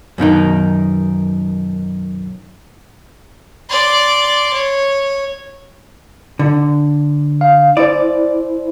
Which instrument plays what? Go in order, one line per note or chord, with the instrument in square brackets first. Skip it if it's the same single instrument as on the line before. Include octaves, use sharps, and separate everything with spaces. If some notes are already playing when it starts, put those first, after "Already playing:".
[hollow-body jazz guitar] F#2 B2 D#3 D#4
[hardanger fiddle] D5 C6
C#5
[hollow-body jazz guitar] D3
[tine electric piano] F5
[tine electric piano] E4 C5 [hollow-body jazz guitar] D5